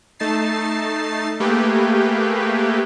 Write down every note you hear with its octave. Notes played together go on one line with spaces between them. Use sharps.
A3 D#4 A5 A6 C7
A3 A#3 G4 G#4 B4